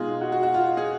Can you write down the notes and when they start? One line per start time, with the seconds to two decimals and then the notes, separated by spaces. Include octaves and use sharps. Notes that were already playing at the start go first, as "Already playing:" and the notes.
Already playing: B2 G#3 D#4 F4 G#4
0.21 F#4
0.32 F#4
0.43 F#4
0.54 F4
0.77 G#4